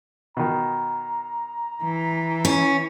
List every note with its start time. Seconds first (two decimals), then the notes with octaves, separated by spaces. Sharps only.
0.37 B2 D#3 A#5
1.84 E3
2.45 C#4